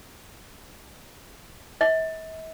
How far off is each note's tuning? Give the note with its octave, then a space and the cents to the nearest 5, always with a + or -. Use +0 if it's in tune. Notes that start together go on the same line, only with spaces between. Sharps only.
E5 -45